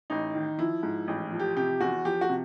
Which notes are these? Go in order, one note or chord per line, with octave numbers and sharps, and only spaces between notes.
A1 D#4
D#3
F3 E4
G#2
A1
F3
G4
C3 G4
E2 F#4
F3 G4
F#4
C3